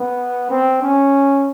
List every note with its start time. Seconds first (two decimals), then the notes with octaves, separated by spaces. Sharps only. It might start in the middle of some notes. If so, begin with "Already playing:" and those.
Already playing: B3
0.50 C4
0.82 C#4